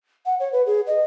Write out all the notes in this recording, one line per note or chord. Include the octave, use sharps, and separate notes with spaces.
F#5
C#5
B4
G#4
D#5